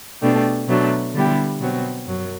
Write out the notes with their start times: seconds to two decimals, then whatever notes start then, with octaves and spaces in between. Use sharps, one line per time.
0.22 B2 A3 D4 G4
0.68 B2 F#3 A3 D4
1.15 D3 G3 B3 E4 G4
1.61 B2 F#3 C4 F#4
2.07 F#2 F#3